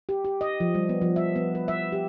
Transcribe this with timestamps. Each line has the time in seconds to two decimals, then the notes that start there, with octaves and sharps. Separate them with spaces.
0.09 G4
0.25 G4
0.41 D#5
0.60 F3
0.75 G3
0.89 B3
1.02 F3
1.16 E5
1.36 B3
1.55 B4
1.68 E5
1.92 G4